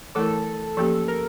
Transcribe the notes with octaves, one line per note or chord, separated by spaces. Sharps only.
E3 A3 E4 A4 A#4
F3 A#3 C#4 G4 A4
A#4